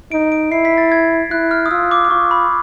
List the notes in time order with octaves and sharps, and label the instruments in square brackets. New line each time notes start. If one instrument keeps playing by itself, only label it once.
[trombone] D#4 [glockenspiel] D7
[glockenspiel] D7
[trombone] E4 [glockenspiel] C7
[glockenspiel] B6
A6
G#6
[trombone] E4 [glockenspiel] F#6
[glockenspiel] F6
D#6
[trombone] F4 [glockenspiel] E6
[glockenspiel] D6
D6
[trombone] F4 [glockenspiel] C#6
[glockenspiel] B5